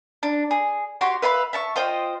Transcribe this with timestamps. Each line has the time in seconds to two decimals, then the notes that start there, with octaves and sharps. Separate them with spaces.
0.23 D4
0.51 G#4
1.01 F#4 G4 C#5 C6
1.22 B4 E5 F5 B5
1.53 E5 A5 C#6
1.76 F4 C5 D#5 G5